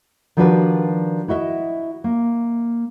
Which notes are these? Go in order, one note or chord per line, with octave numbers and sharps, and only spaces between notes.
D#3 F3 G3 D4 F#4 B4
E4 F#4 D#5 E5
A#3